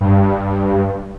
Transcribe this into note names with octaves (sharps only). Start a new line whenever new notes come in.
G2